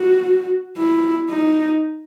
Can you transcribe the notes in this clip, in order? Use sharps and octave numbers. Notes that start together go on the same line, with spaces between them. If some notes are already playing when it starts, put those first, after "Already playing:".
Already playing: F#4
E4
D#4